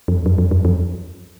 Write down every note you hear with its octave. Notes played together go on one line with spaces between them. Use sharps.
F2
F#2
F2
F#2
F2